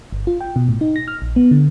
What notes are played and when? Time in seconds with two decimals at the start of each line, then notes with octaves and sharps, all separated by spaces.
0.12 G1
0.27 F4
0.41 G5
0.56 B2
0.69 A2
0.81 D#4
0.96 A#6
1.08 F6
1.22 A#1
1.36 B3
1.51 D3